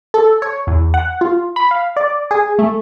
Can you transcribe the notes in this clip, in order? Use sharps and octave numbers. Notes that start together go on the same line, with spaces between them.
A4
C#5
E2
F#5
F4
B5
F5
D5
G#4
A3